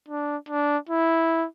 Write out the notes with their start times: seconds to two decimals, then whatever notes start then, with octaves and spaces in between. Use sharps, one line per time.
0.08 D4
0.49 D4
0.90 E4